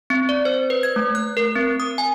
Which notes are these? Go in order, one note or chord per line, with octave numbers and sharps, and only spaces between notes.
C4
D5
C5
B4
G#6
A3
F#6
A#4
C4
D#6
G#5